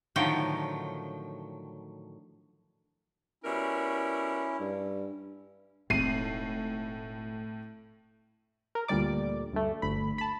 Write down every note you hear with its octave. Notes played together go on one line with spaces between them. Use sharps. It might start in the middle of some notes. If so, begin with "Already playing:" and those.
A2 D3 D#3 F3 F#3 G5
B2 G3 C#4 E4 A#4
G2
E1 A2 C4 D#4 C7 D#7
A#4
D2 A#2 D3 G3 D5 D6
D2 G2 A3
G1 D2 B5
A5 B5